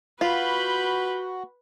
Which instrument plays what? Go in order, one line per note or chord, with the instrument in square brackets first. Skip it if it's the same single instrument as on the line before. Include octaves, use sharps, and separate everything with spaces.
[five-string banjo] F4 [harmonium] F#4 [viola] B4 [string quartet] B5 C6 G6